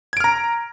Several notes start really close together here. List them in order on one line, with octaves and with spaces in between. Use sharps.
G#6 D7 F6 A#5